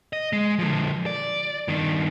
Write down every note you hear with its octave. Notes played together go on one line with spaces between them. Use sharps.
D#5
G#3
D3 F3
D5
G2 D#3